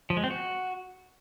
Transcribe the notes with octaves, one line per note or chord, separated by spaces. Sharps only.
F3
G#3
C4
F#4